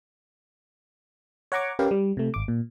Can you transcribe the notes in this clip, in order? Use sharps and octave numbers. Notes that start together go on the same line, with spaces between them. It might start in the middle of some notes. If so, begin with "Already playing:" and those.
C#5 F#5 A#5 C#6 D6
C#4 G4 A#4 B4 F5 G5
G3
C3 A3
G#1 D6
A#2